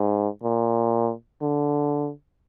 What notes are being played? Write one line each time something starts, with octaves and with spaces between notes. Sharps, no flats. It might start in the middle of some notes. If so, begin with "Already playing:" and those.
Already playing: G#2
A#2
D3